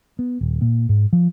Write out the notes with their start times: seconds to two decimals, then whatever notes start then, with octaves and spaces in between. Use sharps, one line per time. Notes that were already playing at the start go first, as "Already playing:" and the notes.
0.19 B3
0.41 D#1
0.61 A#2
0.89 G#2
1.13 F3